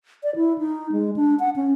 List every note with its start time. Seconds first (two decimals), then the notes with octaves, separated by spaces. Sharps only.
0.23 D5
0.36 E4
0.58 D#4
0.92 G#3
1.16 D4
1.40 F#5
1.56 C#4